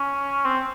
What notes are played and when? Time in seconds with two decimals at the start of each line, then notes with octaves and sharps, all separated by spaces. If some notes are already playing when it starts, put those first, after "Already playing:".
Already playing: C#4
0.45 C4